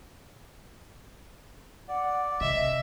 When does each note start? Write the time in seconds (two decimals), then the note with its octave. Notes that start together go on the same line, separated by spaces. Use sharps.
1.88 D5 F#5
2.41 C3 D#5 E5